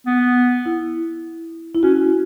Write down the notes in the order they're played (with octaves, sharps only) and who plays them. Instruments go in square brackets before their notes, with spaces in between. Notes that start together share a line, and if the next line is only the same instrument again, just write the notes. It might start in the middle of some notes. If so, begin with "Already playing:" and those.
[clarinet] B3
[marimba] E4
E4
[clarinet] C#4 [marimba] F#4